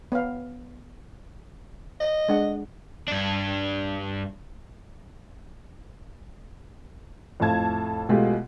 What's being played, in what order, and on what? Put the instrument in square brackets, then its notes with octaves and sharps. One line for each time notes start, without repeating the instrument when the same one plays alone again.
[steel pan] B3 F5
[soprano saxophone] D#5
[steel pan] G#3 D4 F#5
[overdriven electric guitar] G2 D4
[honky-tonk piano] F2 A2 A3 F4 A5 G#6
B2 G#3 A3 F4 G4